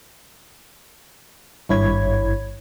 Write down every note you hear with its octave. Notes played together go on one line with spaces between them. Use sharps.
G#1 G2 E4 C#5 B5 G#6